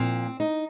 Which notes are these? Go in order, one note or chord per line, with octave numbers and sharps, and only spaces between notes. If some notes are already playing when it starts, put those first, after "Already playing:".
Already playing: A#2 F3 C4
D#4